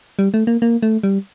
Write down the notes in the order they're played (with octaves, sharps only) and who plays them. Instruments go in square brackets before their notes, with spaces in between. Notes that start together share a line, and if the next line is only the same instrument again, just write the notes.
[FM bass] G3
A3
A#3
A#3
A3
G3